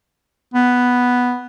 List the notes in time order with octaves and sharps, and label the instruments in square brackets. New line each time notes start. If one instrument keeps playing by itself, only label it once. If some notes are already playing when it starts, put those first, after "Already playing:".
[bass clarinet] B3